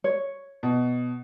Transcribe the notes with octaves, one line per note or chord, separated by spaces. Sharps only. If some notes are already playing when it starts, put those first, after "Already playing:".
C#5
B2